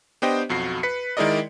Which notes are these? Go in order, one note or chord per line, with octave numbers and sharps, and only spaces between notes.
B3 D4 G4 C5 D#5 G5
B1 F2 F#4 C7
B4 B6 C#7
D#3 G#3 E4 A#4 D5 D#5